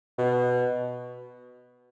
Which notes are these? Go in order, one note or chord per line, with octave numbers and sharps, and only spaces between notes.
B2